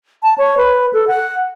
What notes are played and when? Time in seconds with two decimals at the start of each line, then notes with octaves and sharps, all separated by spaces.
0.23 A5
0.38 C#5
0.57 B4
0.93 A4
1.07 F#5